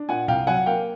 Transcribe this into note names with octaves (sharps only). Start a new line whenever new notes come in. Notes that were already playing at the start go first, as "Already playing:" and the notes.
Already playing: D4
A#2 F#5 G#5
C2 F5 G5
F#3 F#5 G#5
A#3 F5 G5